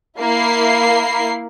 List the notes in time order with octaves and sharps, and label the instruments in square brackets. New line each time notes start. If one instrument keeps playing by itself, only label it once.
[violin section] A#3 E4 C7